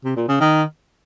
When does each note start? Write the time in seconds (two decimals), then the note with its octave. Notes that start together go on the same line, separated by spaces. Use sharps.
0.04 C3
0.16 A#2
0.28 C#3
0.40 D#3